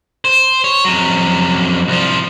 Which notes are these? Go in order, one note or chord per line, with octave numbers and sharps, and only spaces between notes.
C5
C#5
F2 F#3
C2 F3